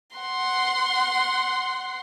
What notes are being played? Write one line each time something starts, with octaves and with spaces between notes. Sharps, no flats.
F#5 C6